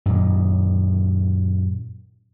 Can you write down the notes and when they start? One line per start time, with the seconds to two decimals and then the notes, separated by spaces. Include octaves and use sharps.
0.06 F#2 A#2 D#3